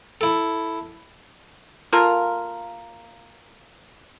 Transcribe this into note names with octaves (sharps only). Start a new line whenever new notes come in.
E4 A4
A#3 F4 A4 A#4